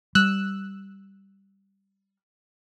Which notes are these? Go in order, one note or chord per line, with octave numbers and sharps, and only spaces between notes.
G3 E6 F#6